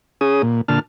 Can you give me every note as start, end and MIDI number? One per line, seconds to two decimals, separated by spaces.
0.21 0.42 61
0.21 0.42 68
0.21 0.42 87
0.42 0.61 46
0.68 0.79 46
0.68 0.79 50
0.68 0.79 81
0.68 0.79 89